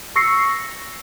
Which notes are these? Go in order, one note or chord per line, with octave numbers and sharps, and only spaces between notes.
C#6 E6 A#6 C7 C#7